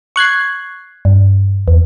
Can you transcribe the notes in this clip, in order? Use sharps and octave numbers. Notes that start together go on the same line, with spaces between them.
C#6 F#6 G#6 C7
G2
E2